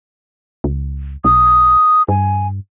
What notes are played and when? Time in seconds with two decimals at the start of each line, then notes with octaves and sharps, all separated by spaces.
0.64 C#2
1.24 B1 D#6
2.08 G2 G#5